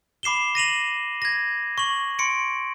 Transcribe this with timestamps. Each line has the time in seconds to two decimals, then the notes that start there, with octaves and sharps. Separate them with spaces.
0.23 B5 D6 C7 E7 G7
0.55 A#6 D#7 F7 F#7
1.22 G#6 A#6
1.78 C#6 F#7
2.19 C6 C#7 D7